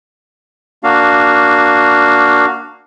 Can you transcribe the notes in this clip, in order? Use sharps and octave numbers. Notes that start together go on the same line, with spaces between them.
A#3 D4 F#4 F5